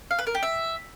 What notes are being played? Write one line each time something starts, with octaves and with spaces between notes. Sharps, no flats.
F5
B4
A#4
G4
E5